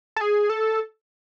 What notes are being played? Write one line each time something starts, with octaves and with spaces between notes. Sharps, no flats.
A4
G#4
A4